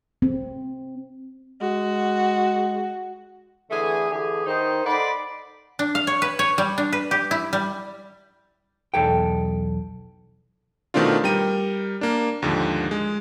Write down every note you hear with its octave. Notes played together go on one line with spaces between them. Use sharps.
C4
G#3 F#4
D3 E3 A3 G#4
D3 E3 G4 G#4
D#3 D#4 C5
D#4 A4 C5 D5 F#5 B5
D4
F5
C#5
B4
C#5
G3
D4
B4
G4
E4
G3
B1 E2 A4 G5
B2 D#3 A3 C4 D4 F4
G3 A#4 G5 D#7
A#3 D4
D#2 G#2 D3 F3
G#3